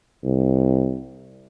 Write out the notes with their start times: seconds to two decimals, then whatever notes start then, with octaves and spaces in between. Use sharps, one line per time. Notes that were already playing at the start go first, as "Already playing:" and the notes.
0.24 C2